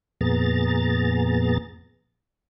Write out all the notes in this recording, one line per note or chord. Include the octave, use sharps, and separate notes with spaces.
F2 A#2 B3 G#4 A#5 A6